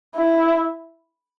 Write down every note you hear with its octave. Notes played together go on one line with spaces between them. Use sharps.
E4